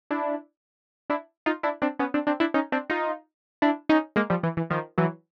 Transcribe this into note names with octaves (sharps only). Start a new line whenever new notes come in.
D4 E4
D4 E4
D#4 F4
D4 E4
C4 D4
B3 C#4
C4 D4
C4 D4
D4 E4
C#4 D#4
C4 D4
D#4 F4
D4 E4
C#4 D#4
G#3 A#3
F3 G3
E3
E3
D#3 F3
E3 F#3